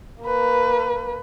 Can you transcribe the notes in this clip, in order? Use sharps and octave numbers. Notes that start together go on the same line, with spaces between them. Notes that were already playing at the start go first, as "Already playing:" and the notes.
A#3 B4